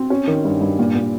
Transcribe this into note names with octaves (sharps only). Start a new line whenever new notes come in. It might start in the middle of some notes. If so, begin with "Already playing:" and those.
Already playing: C4
C#4
D#3
G2
G2
A#2
A#2